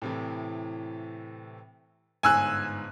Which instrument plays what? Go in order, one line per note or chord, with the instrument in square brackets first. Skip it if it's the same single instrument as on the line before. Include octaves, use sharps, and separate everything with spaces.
[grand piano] A2 C3 E3
[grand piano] G1 G#2 [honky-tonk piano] G#5 E6 F#6